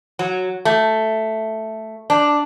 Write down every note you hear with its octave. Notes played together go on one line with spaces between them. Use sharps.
F#3
A3
D4